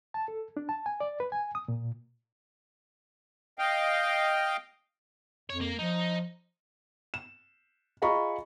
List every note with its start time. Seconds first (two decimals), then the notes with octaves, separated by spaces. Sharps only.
0.14 A5
0.28 A4
0.57 D4
0.69 A5
0.86 G#5
1.00 D5
1.20 B4
1.32 G#5
1.55 D#6
1.68 A#2
3.59 D#5 F5 G5
5.50 F2 C#5
5.61 A#3
5.79 F3 D#4
7.14 E7
8.02 F4 G#4 D#5 A#5 B5 C#6